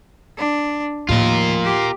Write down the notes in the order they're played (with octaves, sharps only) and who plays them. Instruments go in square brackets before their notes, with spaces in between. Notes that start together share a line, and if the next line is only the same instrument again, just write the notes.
[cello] D4
[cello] D#2 [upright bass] A2 F3 [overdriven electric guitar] F4 A#4
[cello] G4